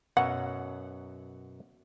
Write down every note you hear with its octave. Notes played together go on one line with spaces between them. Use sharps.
F#2 B2 F#3 F#5